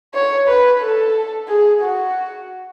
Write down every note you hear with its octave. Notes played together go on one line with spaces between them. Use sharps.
C#5
B4
A4
G#4
F#4